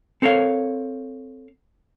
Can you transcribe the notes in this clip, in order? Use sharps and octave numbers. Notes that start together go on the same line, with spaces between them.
C4 A4 A#4 C#5 F5